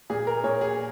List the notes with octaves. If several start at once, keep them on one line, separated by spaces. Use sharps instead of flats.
A#2 G#4
A#4
A#2 C#5
G#4